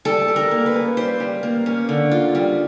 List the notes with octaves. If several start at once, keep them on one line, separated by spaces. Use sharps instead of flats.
G3 A4
G3
A#4
A#3
B4
C#4
G3 C5
G3
A#3
C#4
D3
F4
G3